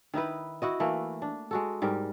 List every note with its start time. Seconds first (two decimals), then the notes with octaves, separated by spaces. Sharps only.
0.14 D#3 D#4 E4 B4
0.62 E4 F#4 D#5
0.80 E3 A3 A#3
1.22 D4
1.51 G#3 F#4 A4
1.82 G#2 G3 A#4